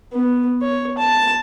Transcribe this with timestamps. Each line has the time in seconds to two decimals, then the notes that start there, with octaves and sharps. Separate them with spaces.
0.13 B3
0.62 C#5
0.98 A5